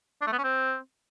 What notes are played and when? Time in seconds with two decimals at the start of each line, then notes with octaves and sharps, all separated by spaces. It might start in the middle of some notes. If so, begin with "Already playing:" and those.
0.21 D4
0.27 A3
0.33 B3
0.38 C#4
0.44 C4